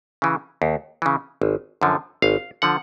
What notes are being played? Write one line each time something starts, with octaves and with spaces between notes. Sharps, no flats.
C#3 E3
D#2
C#3 E3
G#1
F#2 D3 F3
G#1 F5
D3 F3 F#5